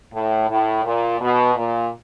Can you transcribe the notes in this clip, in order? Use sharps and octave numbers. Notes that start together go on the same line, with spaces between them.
A2
A2
A#2
B2
A#2